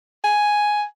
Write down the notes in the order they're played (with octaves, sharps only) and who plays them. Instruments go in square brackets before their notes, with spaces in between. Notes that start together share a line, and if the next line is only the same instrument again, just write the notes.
[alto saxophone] G#5